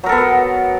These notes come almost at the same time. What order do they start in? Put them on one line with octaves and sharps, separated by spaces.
F#3 A#4 A4 B3